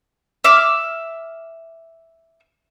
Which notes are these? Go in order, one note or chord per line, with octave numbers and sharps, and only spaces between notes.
E5 D6 F6